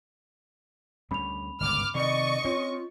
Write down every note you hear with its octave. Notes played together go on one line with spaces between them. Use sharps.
D2 G3 C#4 B5 F7
G1 C#2 G#2 D6 F6
C3 D#3 D5 D#5 C#6
C4 C#4 F4 C#5